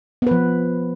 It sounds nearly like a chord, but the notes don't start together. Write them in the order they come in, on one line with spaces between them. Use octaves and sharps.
B3 B4 F3